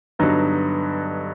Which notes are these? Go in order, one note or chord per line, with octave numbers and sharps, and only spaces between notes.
G2 D3 F#3 B3 D#4